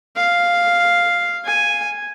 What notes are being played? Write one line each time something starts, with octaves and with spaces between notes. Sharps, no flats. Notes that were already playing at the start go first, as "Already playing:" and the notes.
F5
G#5